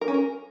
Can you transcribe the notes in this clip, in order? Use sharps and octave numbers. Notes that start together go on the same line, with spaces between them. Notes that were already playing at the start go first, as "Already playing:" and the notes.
A#4
C#4
A#4